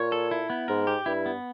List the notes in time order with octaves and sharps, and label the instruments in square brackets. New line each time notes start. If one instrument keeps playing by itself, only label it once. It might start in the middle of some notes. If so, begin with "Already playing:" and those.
Already playing: [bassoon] A#2 [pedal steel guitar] C#5
[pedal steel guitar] A4
E4
B3
[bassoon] G#2 [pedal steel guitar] A#4
[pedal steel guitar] G4
[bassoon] G2 [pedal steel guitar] E4
[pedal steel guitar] B3